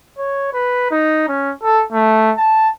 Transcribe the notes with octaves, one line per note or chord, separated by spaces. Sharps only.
C#5
B4
D#4
C#4
A4
A3
A5